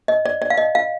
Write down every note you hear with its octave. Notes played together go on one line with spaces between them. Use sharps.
D#5
D5
D5
F5
D#5
F5